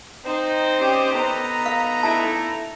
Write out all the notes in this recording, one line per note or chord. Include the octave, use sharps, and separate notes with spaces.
C4 D#4 C5
C#4 G4 D5 D#5
B3 D#4 A4 A#5
F5
D3 A3 E4 A5